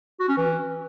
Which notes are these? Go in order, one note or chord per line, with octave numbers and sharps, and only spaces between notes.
F#4
C#4
E3